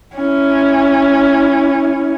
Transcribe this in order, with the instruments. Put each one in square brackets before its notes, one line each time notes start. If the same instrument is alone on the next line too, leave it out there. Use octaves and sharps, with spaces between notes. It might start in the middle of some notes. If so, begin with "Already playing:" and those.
[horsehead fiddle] C#4 E4